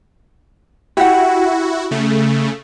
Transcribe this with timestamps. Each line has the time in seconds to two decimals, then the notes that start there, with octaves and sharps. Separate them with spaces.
0.97 E4 F#4 G4 F#5
1.91 C#3 A3